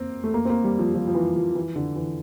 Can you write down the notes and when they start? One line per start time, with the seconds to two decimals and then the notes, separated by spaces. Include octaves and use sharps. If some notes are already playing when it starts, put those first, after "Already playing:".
Already playing: A#3 C4
0.24 A3
0.34 A#3
0.45 C4
0.50 A#3
0.64 G3
0.79 F3
0.94 F3
1.08 F3
1.15 E3
1.36 F3
1.55 E3
1.76 D3
1.96 E3